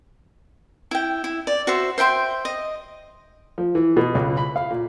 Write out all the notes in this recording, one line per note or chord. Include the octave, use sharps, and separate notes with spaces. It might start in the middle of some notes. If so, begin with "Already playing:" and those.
E4 G5
E4
D5
F#4 C5 E5
C5 E5 G5 C6
D#5
F3
E3
B2
C#2
B5
F5
A#2